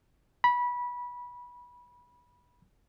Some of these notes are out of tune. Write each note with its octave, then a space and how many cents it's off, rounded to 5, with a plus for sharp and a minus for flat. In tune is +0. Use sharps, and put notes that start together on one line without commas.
B5 -20